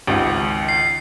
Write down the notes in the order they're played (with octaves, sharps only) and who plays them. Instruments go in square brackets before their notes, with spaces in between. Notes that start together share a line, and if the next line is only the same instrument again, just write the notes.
[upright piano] G#1 C#2
[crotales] C7